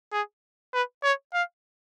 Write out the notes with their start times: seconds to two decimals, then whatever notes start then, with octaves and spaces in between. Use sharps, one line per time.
0.13 G#4
0.74 B4
1.03 C#5
1.34 F5